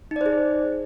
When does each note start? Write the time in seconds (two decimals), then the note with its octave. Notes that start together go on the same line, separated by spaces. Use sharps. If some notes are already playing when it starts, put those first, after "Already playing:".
0.11 D#4
0.16 D5
0.21 C5
0.26 G#4